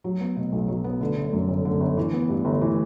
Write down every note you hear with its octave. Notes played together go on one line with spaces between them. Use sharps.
F#3
B3
B2
B1
F#3
B3
D3
G1
F#2
G1
D3
G1
E3
B3
G2
G1
E3